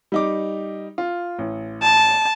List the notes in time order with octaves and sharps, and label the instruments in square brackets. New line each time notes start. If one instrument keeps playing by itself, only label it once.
[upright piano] G3 D#4 D6
F4
A1
[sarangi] A5